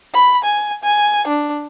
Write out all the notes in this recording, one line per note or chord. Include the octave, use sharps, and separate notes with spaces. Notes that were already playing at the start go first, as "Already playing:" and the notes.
B5
G#5
G#5
D4